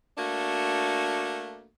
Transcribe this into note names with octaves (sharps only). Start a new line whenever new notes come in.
A3 A#3 D4 F#4